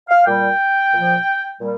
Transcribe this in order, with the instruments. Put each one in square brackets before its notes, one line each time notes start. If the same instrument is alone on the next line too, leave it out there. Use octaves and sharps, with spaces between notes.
[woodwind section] F5
A#2 G3 G5
A#2 F3
A#2 G3